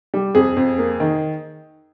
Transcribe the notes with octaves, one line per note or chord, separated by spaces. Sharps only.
G3
F2 G#4
F2
A#3
D#3